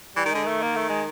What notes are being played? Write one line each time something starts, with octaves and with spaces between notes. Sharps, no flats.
E3 G3
D#3
D3 G#3
D#3 A3
A#3
A3
G#3